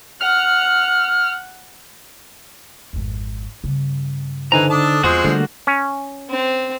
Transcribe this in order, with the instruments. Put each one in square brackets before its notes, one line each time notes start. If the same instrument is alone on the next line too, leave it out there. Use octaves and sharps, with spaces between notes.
[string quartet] F#5 [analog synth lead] F6
[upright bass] G#1 F2
G2 C#3
[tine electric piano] D3 D#4 C5 [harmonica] E3 [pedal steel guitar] B4 G#5 A#5
[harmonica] D4 A5 D#6 [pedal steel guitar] A4
[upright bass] E2 [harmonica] F3 G#3 C4 [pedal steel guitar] F#4 D#6
[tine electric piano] D3 G3 [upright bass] E3 F#3 [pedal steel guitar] A3 A#3 F#4
[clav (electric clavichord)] C#4
[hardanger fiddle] C4